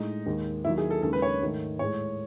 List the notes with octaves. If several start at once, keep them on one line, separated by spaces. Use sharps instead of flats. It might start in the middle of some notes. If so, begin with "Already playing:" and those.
Already playing: A2 G#3 D#4
D#2 D#3 G#3
D#2 D#3 F#3 E4
G#4
A4
D#2 C#3 G#3 A4
B4
C#5
G#2 D#3 A3
A2 G#3 C#5